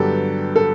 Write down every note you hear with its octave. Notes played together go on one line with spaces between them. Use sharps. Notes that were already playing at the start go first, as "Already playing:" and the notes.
Already playing: G2 D3 F#3 B3 G4 A4
A4